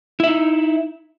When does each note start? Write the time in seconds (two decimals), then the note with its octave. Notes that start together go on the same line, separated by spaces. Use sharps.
0.20 E4
0.24 E5
0.27 D#4